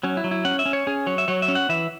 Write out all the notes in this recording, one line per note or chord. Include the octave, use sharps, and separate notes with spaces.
F#3 C#4
E4
F#3
E4
C#4 F#5
E5
C#4
C#5
C#4 G#4
F#3 C#5
E5
F#3 C#5
E5
C#4
F#5
E3 E5